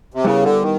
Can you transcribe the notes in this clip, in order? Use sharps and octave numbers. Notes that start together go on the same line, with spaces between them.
C3
C#3 G3 B3 E4 G4 A#4
D3
D#3